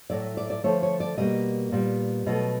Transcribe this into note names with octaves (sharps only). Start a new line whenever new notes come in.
A2 F#3 A3 D5
D5
D5
D3 F3 A3 C#5
C#5
D5
B2 G3 A#3 D#5
A#2 G3 B3
B2 F#3 A3 D#5